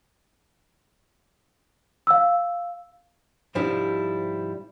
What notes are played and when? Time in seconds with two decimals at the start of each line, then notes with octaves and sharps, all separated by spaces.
2.07 F5 E6
3.55 G#2 C3 F3 G3 D4 E4